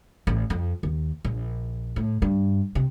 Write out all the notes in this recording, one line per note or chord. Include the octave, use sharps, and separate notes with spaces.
A1
F2
D#2
A#1
A2
G2
C3